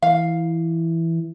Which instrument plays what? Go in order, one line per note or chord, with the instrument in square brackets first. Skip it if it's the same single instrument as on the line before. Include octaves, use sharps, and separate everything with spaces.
[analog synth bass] E3 [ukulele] F5